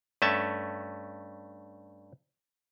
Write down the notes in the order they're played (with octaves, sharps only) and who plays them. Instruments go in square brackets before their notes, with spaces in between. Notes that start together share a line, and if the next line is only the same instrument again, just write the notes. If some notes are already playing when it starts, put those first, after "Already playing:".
[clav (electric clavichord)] G2 A3 C#4 E5 A5